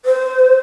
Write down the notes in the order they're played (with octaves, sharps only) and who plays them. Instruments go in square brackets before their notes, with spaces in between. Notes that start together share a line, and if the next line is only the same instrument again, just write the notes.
[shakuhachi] C5